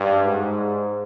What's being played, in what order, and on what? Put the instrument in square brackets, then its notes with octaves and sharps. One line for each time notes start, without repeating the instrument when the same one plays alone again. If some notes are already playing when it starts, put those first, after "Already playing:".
Already playing: [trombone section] G2
G#2